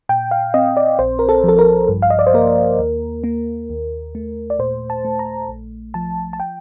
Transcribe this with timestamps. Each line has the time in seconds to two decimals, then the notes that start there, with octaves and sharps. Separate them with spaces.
0.09 A#2 G5
0.31 F5
0.54 C4 D#5
0.77 D5
0.99 A#1 C5
1.19 A#4
1.29 A4
1.44 F3 A4
1.59 A#4
1.89 G2
2.02 F5
2.10 D#5
2.19 D5
2.27 C5
2.34 A#3 A#4
2.79 D#2
3.24 A#3
3.70 D#2
4.15 A3
4.50 D5
4.59 A#2 C5
4.90 A5
5.05 A3
5.19 A#5
5.49 A#1
5.94 F3 A5
6.33 A5
6.40 G5